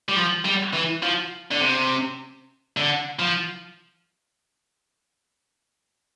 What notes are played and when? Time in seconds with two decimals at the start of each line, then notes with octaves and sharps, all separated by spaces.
0.09 G3
0.16 F3
0.45 G3
0.74 E3
1.03 F3
1.51 D3
1.60 C3
2.77 D3
3.19 F3